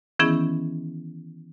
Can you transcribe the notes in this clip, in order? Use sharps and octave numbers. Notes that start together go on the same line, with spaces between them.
D#3 E3 B3 C#4 E4 G#4